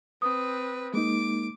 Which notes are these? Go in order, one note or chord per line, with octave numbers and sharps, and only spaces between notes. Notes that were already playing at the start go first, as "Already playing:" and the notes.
C4 B4 D#6
G#3 A#3 D#4 D6